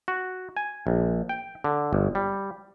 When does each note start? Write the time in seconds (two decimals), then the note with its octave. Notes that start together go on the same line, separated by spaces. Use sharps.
0.08 F#4
0.57 G#5
0.87 A#1
1.29 G5
1.64 D3
1.93 G1
2.15 G3